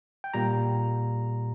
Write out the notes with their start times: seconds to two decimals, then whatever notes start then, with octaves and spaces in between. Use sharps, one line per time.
0.24 G5
0.34 A#2 G3 A#3 A#5